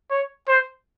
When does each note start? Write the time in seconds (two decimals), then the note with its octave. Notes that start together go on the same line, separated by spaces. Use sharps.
0.10 C#5
0.48 C5